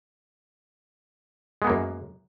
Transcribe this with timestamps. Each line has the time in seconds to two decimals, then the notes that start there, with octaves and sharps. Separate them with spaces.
1.62 G#3
1.64 B3
1.67 A#3
1.70 F#2